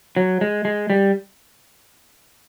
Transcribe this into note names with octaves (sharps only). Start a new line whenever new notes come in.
F#3
G#3
G#3
G3